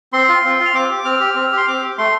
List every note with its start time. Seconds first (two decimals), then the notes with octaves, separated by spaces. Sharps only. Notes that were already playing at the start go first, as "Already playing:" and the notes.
0.13 C4 C6
0.29 F4
0.44 C4
0.60 F4
0.65 F6
0.74 C4 D6
0.90 G4
1.05 C4 F6
1.20 G4
1.36 C4
1.52 G4
1.57 C6
1.68 C4 D6
1.82 G4
1.98 A3 C6